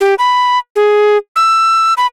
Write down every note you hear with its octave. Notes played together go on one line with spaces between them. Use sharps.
G4
B5
G#4
E6
B5